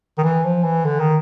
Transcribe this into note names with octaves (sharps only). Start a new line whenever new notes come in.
D#3
E3
F3
E3
D3
D#3